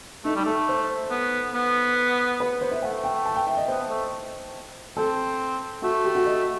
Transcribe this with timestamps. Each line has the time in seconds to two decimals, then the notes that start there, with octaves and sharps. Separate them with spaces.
0.25 A3 D#4
0.36 G3
0.45 A3 A4
0.69 C5
1.11 B3
1.54 B3
2.40 B4
2.61 C5
2.71 E5
2.82 A3 F#5
3.04 G5
3.26 A5
3.36 G5
3.47 E5
3.57 D#5
3.68 B3 C5
3.89 A3
4.97 C4 A4
5.82 A3 F#4
6.04 G4
6.15 F#4
6.26 D#5